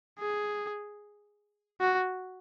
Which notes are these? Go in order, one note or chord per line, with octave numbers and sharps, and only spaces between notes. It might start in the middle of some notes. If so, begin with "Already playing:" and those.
G#4
F#4